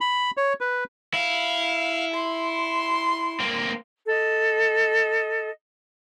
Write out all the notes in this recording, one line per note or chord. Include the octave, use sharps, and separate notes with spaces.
B5
C#5
B4
E4 F5
C6
A#3 C4
A4 D#5